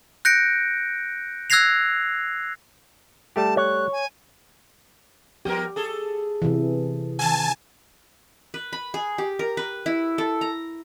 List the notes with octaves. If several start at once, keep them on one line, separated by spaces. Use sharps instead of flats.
F#6 G6 A#6 C#7 D7
E6 F#6 G#6 A#6 C7 F7
G3 A3 G4 A5
C#5 F#6
G#5
F3 B3 G4 A#4
G#4 A4
C3 E3
D#3 G#5 A5
B4
B5
G#4
G4
A#4
B4
E4
A4
A#5